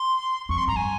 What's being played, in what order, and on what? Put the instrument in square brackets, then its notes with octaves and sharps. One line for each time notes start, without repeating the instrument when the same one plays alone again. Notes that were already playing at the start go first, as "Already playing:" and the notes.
Already playing: [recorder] C6
[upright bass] F2 [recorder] C#6
[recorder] C6
[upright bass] G2 [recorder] A#5
[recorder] G#5